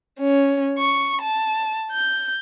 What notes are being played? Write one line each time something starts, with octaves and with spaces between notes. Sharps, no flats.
C#4
C#6
A5
G6